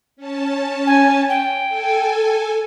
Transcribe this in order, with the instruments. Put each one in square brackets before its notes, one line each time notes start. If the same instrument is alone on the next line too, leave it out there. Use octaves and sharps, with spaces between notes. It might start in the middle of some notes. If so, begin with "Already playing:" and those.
[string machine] C#4 A5
[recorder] G#5
G5
[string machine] A4 G#5